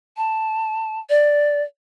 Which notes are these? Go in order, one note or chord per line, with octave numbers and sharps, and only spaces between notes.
A5
D5